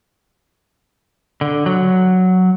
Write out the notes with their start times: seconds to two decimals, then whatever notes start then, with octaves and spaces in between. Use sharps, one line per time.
1.41 D3
1.66 F#3